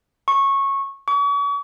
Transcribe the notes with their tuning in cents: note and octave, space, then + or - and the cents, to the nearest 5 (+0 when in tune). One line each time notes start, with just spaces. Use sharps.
C#6 -15
C#6 +40